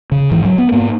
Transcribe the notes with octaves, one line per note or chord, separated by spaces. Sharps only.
C#3
G#2 E3
F#3
B3
G#2 A#3